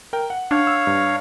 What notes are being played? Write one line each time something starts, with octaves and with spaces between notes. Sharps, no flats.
A#4 G5
F#5
D4 C#5 F5
E6
G2